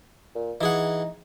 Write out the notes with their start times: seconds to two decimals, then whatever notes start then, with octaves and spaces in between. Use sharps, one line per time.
0.35 A#2
0.61 E3 D#4 G#4 F#5